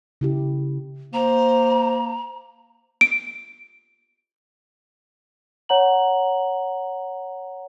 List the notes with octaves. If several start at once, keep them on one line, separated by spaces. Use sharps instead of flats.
C#3 E4 G4
A#3 C5 A#5
D7
C#5 F#5 A#5 F#7